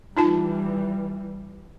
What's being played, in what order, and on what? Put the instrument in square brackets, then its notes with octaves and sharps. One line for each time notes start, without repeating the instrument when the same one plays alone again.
[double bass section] E3 G3 [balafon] D#4 F4 A5